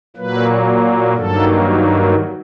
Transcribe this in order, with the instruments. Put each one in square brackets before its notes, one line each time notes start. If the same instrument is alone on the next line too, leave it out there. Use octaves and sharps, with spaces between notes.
[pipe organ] A#2 F#3 A#3 B4
G2 D#3 F#3 A#3 A4